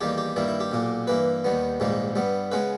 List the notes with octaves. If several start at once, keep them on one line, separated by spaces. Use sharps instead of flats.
E2 D#3 G3 A#3 G4
G4
G2 D#3 G3 A#3 E4
E4
G4
B1 A#2 A#3
G2 E3 A#3 B4
D#2 D#3 G3 B3
A#1 G#2 D#3 G3 A#3
G2 G3 B3
C#3 G#3 B3 B4